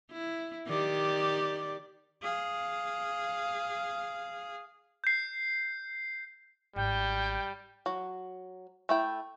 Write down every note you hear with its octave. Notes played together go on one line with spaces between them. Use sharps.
E4
D#3 G4 D5
G#4 F5
G6 C7
G#1 G3 G5
F#3
A3 E4 G5